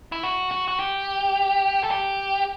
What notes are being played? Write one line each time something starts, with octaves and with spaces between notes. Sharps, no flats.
E4
F#4
F#4
F#4
G4
A4
G4